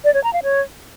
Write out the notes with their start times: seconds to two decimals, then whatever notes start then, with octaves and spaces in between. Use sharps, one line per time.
0.04 D5
0.14 C#5
0.24 A#5
0.33 F5
0.43 C#5